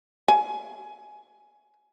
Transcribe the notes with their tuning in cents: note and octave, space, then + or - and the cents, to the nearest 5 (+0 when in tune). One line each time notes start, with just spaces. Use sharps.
G#5 +20